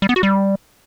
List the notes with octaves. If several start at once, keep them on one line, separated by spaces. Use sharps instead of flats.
G3
B3
F#4
G3